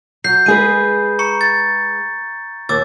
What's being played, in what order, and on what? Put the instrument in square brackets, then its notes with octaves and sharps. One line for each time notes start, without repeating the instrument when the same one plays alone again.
[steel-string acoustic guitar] F#3 [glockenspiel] G6 C7
[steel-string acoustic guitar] G#3 G#4 B4 [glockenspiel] D#7
[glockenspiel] A#5 C#6 C#7
A6
[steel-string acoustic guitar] D#2 [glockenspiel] D6 E6 A6